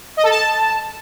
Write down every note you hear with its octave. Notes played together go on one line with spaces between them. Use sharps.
D#5
A4
A5